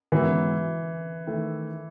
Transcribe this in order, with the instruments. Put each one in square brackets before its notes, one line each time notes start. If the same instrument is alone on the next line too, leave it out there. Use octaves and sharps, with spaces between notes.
[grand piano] G#2 F#3 B3 E4 [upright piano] E3
[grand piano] D#3 A3 E4